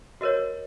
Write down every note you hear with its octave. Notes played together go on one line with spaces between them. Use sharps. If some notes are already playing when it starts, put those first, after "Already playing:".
F#4 A#4 C#5 D#5